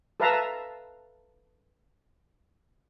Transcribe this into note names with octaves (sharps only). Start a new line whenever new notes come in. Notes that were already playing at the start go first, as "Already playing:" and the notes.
A4 B4 E5 F5 A5 A#5